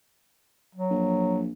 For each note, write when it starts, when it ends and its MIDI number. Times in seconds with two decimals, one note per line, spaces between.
0.75 1.45 54
0.90 1.52 34